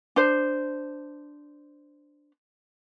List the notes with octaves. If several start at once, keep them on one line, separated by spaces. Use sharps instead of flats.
D4 C5